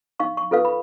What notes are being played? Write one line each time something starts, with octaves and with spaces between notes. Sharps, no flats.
D#4 F5 C#6
C#6
F4 A4 B4 F5
B5